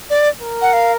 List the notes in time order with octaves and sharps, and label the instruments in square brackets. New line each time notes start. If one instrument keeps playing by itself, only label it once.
[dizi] D5
[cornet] A#4
[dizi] F#5
F5